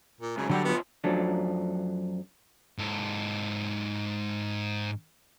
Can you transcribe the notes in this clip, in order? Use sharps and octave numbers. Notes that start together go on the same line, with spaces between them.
A#2
G#2 C#3 F#3
D3 F#3 G3 D4 G4 F#5
D#3 B3 F4
F#2 F3 F#3 A3 D4
G#2 A4